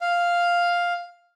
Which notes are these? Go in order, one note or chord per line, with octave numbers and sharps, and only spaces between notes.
F5